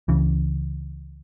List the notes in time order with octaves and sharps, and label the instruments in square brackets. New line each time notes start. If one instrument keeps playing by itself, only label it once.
[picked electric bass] C#2 C#3 E3